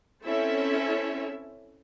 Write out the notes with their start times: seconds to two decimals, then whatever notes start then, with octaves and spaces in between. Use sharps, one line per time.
0.25 C4 C#4 E4 A4 E5